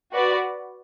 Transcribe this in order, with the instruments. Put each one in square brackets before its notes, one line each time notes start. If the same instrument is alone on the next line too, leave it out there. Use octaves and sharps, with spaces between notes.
[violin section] F#4 B4 D5